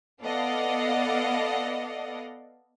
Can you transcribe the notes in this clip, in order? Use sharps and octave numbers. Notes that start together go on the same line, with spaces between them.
B3 A4 D5 D#5 F5 F#5